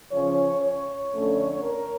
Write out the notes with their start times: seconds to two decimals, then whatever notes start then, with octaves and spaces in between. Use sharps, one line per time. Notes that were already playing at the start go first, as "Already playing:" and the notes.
0.11 C#3 F3 C#4 C#5
0.61 C#5
1.12 F2 D3 A3 C#4
1.62 A#4